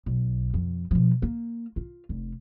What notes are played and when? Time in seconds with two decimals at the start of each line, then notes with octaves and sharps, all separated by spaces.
0.06 B1
0.54 F2
0.91 B2 F3
1.22 A#3
1.76 F4
2.09 F1